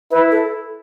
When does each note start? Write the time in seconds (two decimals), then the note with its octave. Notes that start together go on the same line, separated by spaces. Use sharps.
0.11 E4 B4
0.32 A4